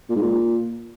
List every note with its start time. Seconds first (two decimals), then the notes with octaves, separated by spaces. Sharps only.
0.10 A#2
0.16 G#2
0.22 A#2